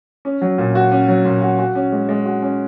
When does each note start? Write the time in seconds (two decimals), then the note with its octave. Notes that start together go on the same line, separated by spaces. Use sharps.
0.25 C#4
0.42 F#3
0.58 A#2
0.75 F#4
0.92 C#4
1.08 F#3
1.25 A#2
1.42 F#4
1.59 F#4
1.75 C#4
1.92 G#3
2.09 G#3
2.26 F#4
2.42 C#4